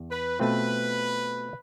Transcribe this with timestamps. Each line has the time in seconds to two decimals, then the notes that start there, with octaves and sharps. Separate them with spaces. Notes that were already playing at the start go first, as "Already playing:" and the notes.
Already playing: E2
0.10 B4
0.39 B2 A3 C4 F4 B4